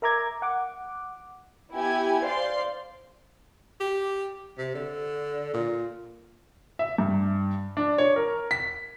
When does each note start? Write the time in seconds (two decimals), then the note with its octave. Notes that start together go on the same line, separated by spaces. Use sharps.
0.02 A#4 E5 A#5 D6 G#6
0.42 F#5 D6
1.73 B3 E4 G4 G#5 G#6
2.23 C5 D5 F5 C6
3.80 G4
4.58 C3
4.75 D3
5.54 A#2
6.79 E5
6.98 G2
7.77 D4
7.98 C#5
8.16 A#4
8.51 B6